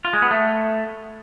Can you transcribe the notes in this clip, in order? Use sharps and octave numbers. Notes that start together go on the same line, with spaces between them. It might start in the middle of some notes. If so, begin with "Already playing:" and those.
F4
G#3
B3
A3